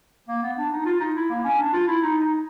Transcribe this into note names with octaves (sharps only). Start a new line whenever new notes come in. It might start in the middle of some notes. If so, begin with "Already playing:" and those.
A#3
B3
D4
D#4
F4
D#4
E4
A#3
C#4
D4
F4
E4
D#4
D#4